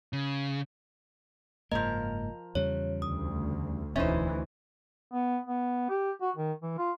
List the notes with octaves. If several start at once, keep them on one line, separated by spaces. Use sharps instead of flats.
C#3
F#1 G#2 F3 A#3 A#4 D#5
E2 C#3 G3 C#5
D2 D#6
E1 D2 E3 C#4 D#4 C5 E5
B3
B3
G4
F#4
D#3
E3
F4